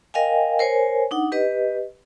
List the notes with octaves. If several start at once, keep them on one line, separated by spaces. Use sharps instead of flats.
A#4 D#5 F5 G5 G#5
A#4 C5 C#5 G#5
D4 D#4 F#5
G4 B4 D#5